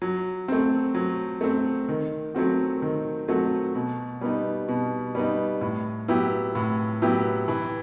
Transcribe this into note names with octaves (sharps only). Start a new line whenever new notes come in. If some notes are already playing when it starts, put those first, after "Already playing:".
F#3
A3 C4
F#3
A3 C4
D#3
F#3 A3 C4 F#4
D#3
F#3 A3 C4 F#4
B2
G3 B3 D#4
B2
G3 B3 D#4
A2
F#3 B3 E4 G4
A2
F#3 B3 E4 G4
E3